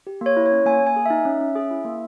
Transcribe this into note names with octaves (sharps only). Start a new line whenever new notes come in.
G4
A#3 C#5
E4
C#5
C#4
A#3 G#5
A#3
G#5
G#4
D#4 E5
C#4
C#4
G#4
E4
A#3